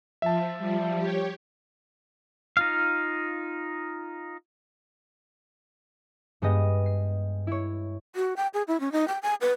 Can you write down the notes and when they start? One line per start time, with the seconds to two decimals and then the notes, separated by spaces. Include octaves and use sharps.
0.22 F3 E5 A5
0.59 F3 G3
0.98 G4 C#5
2.57 D#4 F4 F5
6.42 G2 G#3 B3 G4 D#5 A#6
6.86 C7
7.47 E4 C#5
8.16 F#4
8.36 G5
8.54 G#4
8.68 E4
8.80 C#4
8.92 D#4
9.08 G5
9.22 G#5
9.41 B4